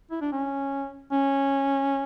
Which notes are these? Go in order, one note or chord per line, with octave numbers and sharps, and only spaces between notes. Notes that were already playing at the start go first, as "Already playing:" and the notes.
E4
D4
C#4
C#4